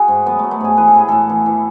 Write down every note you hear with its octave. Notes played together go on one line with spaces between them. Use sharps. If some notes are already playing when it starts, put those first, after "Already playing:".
Already playing: F#4 G#4
G#2
F#3 B3
F#3 A3
B3
G#2 G#4
E3 B4
A4
A2 G#4
A2 A4
E3
E3